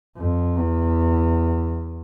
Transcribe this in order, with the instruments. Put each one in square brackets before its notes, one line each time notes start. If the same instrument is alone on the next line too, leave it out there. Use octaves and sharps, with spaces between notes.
[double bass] F2
E2